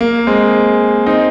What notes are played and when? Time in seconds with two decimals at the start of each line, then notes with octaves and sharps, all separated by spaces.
0.01 A#3
0.27 G#3 C4
1.06 C4 D#4